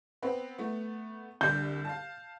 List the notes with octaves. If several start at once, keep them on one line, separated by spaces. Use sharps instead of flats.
B3 C4 B4
A3 B3
C2 D3 G6
F5 A5